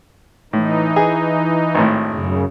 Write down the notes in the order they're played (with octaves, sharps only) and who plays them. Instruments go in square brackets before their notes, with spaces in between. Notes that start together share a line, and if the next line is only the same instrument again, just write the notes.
[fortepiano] A2 [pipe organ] E3 D#4
[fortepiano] G#4
G#1 A2
[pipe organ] F#2 C#3